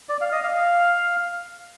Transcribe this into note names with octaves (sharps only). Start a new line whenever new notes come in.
D5
F5
D#5
F5